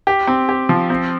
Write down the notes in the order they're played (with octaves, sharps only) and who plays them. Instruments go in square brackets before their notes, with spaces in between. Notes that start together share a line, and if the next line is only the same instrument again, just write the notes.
[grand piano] G4
C4
G4
F3
C4